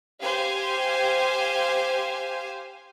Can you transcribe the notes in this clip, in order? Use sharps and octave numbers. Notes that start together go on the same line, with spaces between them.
G4 C5 F5 G#5